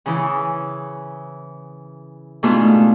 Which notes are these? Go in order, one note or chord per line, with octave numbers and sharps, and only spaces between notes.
C#3 E3
G#2 B2 A3 D4 F4